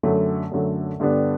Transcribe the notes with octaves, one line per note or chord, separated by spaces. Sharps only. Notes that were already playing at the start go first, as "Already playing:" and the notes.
F#2 D3 F#3 A3
F#2 D3 F#3 A3
G2 D3 G3 B3 D4